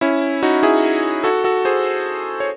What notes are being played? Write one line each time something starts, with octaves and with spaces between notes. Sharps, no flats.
C#4 E4
D#4 F#4
E4 G#4
F#4 A4
F#4 A4
G#4 C5
C#5